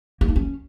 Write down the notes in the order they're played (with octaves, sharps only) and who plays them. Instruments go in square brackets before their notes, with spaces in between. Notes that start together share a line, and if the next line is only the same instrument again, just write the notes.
[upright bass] A#3
D#4
C#4